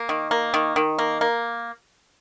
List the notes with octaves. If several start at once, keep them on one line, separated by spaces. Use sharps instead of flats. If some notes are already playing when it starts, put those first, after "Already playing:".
Already playing: A#3
D#3
A#3
D#3
D#3
A#3
A#3